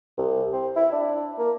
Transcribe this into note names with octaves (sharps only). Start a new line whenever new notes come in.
C2
C4
E4
D4
A#3